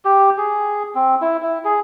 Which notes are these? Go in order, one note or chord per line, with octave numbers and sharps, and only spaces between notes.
G4
G#4
C4
E4
E4
G#4